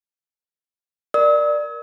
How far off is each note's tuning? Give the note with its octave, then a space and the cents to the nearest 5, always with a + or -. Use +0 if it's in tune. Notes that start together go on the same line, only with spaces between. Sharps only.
A#4 +15 D5 +15 E6 -45